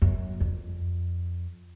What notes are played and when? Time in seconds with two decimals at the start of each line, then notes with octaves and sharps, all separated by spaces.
0.02 F#2
0.41 F2